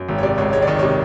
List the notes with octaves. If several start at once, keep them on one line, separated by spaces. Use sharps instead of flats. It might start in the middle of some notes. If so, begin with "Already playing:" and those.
Already playing: F#2
G#1
C#5
C3 D5
C#2 C#5
G#3 C#5
D5
D#3 C#5
C3 C#5